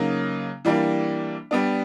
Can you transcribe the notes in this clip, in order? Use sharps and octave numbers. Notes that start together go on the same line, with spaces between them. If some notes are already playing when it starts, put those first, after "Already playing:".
Already playing: C#3 F#3 A#3 D#4
E3 G3 A#3 D4
G3 B3 D4